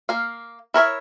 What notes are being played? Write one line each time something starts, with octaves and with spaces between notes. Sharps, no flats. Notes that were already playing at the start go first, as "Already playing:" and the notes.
A#3 F5
E4 A#4 C#5 E5